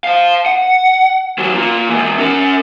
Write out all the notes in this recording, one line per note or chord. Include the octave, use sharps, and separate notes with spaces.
C5 F5
F#5
E3 F#3
A#3 F4
E3 G#3
C#4 A#4